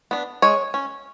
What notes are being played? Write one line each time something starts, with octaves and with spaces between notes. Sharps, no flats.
B3 D4
G#3 C#5
C#4